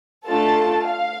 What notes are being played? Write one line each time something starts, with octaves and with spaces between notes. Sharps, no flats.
A3 D4 F4 A4 A5
F5